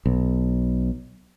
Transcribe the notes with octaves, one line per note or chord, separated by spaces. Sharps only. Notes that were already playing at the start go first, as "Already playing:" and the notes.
B1